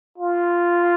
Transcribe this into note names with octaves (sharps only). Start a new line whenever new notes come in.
F4